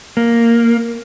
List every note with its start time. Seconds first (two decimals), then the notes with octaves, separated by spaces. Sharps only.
0.17 A#3